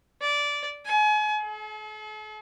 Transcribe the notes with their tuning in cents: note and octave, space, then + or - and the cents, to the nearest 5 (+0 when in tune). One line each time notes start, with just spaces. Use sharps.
D5 -15
G#5 +35
A4 -45